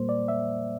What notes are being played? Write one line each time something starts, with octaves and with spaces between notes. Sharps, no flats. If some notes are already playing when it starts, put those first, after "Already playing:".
Already playing: A#2 G3 A#3 C5
D5
E5